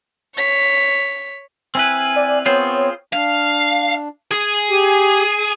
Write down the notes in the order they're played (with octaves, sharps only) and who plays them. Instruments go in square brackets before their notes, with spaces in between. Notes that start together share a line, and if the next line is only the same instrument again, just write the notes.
[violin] C#5 B6
[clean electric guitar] C4 E4 B4 [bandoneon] G#5 F6
[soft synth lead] D5
[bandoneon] B3 C4 [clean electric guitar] F4 G#4 C5 [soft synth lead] C#5
[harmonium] D4 [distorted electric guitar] F5
[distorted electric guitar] G#4
[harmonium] G4 G#5